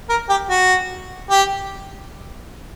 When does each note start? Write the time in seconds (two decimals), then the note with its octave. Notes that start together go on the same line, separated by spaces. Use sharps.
0.09 A#4
0.29 G4
0.50 F#4
1.30 G4